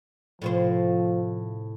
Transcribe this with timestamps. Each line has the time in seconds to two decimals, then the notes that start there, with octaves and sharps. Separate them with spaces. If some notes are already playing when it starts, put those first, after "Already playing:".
0.42 A2 C3 F3 C5